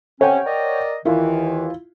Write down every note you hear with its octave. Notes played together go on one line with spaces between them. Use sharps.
C3 C#4 C#5 F#5 G5
A#4 D5 D#5
D#2 D#3 E3 E4 F4